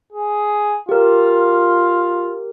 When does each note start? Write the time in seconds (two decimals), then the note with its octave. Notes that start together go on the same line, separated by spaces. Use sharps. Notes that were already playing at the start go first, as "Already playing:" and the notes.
0.13 G#4
0.89 F4 G4 A#4